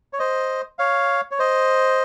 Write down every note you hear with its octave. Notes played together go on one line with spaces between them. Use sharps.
C#5
C5 D#5
C#5 F5
C#5
C5 D#5